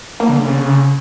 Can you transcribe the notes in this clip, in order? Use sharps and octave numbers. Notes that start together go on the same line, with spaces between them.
A#3
D3
C#3